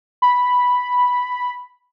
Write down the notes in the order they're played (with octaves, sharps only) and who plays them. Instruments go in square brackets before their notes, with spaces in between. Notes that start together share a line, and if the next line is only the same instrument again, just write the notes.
[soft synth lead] B5